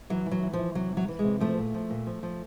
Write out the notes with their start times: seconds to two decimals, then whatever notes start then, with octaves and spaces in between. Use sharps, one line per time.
0.10 E3 F#3
0.26 E3
0.31 F#3
0.43 E3
0.53 F3
0.59 E3
0.75 C3 F#3
0.92 E3 F#3
1.08 E3
1.19 G#3
1.24 C3
1.40 F3 A3
1.57 A#2
1.74 F3
1.90 A#2
2.07 F3
2.23 F3